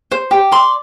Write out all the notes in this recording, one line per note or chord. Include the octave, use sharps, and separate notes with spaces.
C5
G4
D5 C6